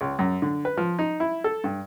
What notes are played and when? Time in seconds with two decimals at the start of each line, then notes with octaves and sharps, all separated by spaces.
0.01 C#2
0.19 F#2
0.42 D3
0.65 B4
0.77 F3
0.99 D#4
1.20 E4
1.44 A4
1.64 G2